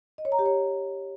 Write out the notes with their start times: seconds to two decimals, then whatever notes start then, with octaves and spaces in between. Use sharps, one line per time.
0.18 D#5
0.25 C#5
0.32 A#5
0.39 G4
0.46 C#5